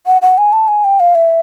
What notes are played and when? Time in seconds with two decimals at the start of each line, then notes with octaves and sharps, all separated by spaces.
0.06 F#5
0.22 F#5
0.38 G#5
0.53 A5
0.68 G#5
0.84 G5
1.00 F5
1.15 E5